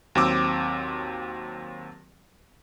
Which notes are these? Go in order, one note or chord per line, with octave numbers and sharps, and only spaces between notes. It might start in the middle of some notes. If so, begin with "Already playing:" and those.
D#2 F#3 C4 D6 E6